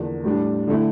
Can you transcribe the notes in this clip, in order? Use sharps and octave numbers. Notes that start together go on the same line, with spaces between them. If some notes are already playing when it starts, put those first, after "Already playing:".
Already playing: E2 D3 F3 A#3 D4
A2 G3 D4
D3 A3 E4